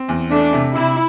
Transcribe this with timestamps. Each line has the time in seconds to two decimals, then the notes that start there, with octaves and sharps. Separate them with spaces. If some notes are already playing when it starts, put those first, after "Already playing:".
Already playing: C4
0.08 E2
0.30 A3 D4
0.53 C3
0.75 C3 E4